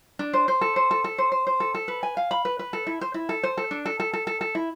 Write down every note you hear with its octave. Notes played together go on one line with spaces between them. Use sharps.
D4
C5
C5
A4
C5
A4
A4
C5
C5
C5
A4
A4
B4
G#5
F5
B5
B4
B4
A4
E4
C5
E4
A4
C5
A4
D4
A4
A4
A4
A4
A4
E4